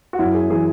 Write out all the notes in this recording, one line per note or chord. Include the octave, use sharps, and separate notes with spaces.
F#4
F#2 E4
G#4
E3 G#4